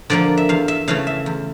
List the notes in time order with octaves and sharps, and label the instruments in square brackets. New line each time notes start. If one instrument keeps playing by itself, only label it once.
[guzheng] D3 F3 A#3 D5
E5
E2 F5
E5
C#3 E3 A3 F5
E5
E2